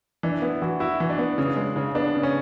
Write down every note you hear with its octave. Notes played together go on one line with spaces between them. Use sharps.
E3 D4
B3 E4
E3 F#4
E4 F#4
E3
D4
B3
C#3
G#3
C#3
B3 D4
C#3
C#4